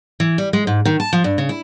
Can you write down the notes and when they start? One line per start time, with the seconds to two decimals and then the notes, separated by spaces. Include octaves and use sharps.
0.20 E3
0.38 G3
0.53 G#3
0.67 G#2
0.85 D#3
1.00 A5
1.13 F3
1.24 G2
1.38 C#3
1.49 E4